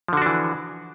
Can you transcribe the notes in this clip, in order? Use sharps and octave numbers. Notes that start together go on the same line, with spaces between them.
D3 E3 F3 D4 F#4